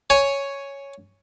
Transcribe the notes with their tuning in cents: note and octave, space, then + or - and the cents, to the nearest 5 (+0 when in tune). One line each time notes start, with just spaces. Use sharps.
C#5 +0 G#5 +0